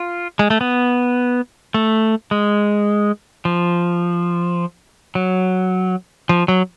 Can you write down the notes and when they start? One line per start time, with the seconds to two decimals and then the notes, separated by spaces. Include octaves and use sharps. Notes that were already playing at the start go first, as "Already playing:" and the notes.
Already playing: F4
0.39 G#3
0.50 A3
0.61 B3
1.74 A3
2.31 G#3
3.45 F3
5.15 F#3
6.29 F3
6.48 F#3